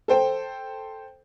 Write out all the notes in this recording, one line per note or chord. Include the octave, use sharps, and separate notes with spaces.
A4 C5 G5